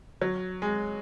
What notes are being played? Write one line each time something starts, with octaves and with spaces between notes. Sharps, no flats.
F#3
G#3